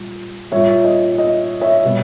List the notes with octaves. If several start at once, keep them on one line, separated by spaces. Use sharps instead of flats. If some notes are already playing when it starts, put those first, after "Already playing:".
Already playing: A#2 G3
A#2 G3 C#5 E5
D#5
D#5
C#5 E5
B2 G3